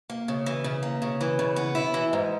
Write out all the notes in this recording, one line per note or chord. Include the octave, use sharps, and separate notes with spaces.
A#3
C#3
E3
C#3
A#3
C#3
E3
C#3
B3
E4
E3
G#2